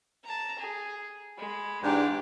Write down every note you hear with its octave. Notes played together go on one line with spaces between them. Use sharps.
A5 A#5
G#4
G#3 B5
E2 G#2 D4 G4 D6